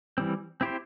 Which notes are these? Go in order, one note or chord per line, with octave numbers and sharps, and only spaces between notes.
E3 G3 C4
C4 E4 G4 C5